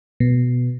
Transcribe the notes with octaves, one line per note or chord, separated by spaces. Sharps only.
B2